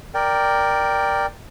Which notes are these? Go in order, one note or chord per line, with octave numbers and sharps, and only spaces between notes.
A#4 D5 G5